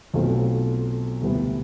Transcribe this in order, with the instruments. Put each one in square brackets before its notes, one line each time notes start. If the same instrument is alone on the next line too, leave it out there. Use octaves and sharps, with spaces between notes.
[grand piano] B1 B2 A3 C4 F4
D2 C3 G3 B3 E4